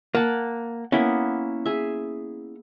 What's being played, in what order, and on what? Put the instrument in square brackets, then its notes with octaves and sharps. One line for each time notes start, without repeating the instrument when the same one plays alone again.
[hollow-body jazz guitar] A#3 [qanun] F#5 A5
[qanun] A#3 B3 [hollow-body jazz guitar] C#4 E4
[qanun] G#4 E5